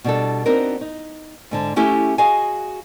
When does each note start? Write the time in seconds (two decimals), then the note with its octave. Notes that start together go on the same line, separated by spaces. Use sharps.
0.04 B2 G3 D4 A4
0.46 B3 C4 D4 D#4 F#4 A#4
0.81 D#4
1.51 G#2 D3 A5
1.76 A3 C#4 E4 G4 A4
2.18 F#4 G#4 D#5 F5 G#5